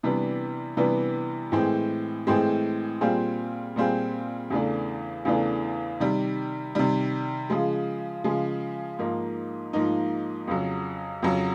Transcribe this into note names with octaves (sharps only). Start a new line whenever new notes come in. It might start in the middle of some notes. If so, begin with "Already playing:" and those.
C3 E3 G3 B3 D4
C3 E3 G3 B3 D4
A2 E3 G#3 C4
A2 E3 G#3 C4
A#2 G3 C4 F4 G#4
A#2 G3 C4 F4 G#4
E2 C#3 E3 A3 D4
E2 C#3 E3 A3 D4
C3 D#3 G3
C3 D#3 G3
C#3 F3 G#3
C#3 F3 G#3
G#2 F3 A#3 D#4
G#2 F3 A#3 D#4
F2 C#3 F#3
F2 C#3 F#3